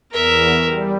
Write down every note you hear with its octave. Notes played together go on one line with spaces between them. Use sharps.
E2 A#4 E5
G3